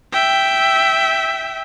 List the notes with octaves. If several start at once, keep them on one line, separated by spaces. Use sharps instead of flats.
E5 G5